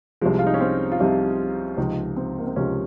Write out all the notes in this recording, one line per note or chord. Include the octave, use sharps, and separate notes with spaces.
C2 C3 F3 G#3
F4
D#4
C#4
C4
F4
C2 C3 F3 D#4
C#2 C3 F3 D#4
C4
A#3
C4
C#2 C3 F3 C#4